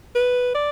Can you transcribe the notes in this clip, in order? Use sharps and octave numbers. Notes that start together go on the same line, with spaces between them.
B4
D5